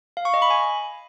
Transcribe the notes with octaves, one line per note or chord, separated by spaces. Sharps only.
F5
C#6
D#5
B5
G#5